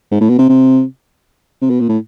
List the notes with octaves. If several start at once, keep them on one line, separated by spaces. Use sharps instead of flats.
G#2
A2
B2
C3
C3
C3
B2
A#2
A2